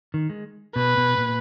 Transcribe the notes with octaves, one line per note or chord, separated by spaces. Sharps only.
D#3
G#3
B2 B4
B2
A#2